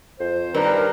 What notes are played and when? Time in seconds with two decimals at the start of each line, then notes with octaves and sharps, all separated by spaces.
0.20 F2 C5
0.55 G2 D#3 A#4